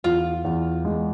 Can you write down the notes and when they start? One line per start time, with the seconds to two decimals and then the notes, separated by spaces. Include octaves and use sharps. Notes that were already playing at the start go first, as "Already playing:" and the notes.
0.04 E2 F4
0.45 E2
0.85 G#3